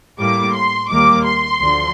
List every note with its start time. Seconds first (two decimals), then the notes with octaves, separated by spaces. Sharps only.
0.19 A2 G3 A#3 D6
0.55 C6
0.90 D#2 D#3 G3 A#3 D6
1.25 C6
1.60 D2 D3 F3